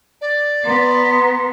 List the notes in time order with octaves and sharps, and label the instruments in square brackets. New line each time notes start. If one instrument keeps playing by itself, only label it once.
[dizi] D5
[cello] B3 [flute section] B4 A#5 C6